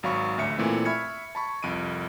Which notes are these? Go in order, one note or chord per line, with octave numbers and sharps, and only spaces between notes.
G#1 F#3 F5 B5 C#6
A1 D2 E5 C#7
A#2 E3 A3 C4 E4
E5 B5 C#6 F6 G#6 C#7
A5 B5 C#6
C2 F2 D7 D#7